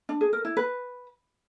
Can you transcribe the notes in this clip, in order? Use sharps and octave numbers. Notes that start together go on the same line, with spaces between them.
D4
G#4
A#4
E4
B4